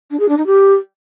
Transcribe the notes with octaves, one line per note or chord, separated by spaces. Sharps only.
D4
G#4
D4
D#4
G4